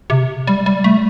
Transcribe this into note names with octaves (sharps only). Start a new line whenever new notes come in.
C3
G3
G3
A3